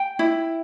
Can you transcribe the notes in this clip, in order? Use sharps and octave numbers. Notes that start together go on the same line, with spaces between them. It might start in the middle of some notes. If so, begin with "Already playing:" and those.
Already playing: G5
E4